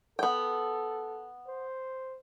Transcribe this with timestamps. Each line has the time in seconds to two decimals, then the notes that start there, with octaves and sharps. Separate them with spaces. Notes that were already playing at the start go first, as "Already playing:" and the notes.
0.19 B3 A4 G5
1.47 C5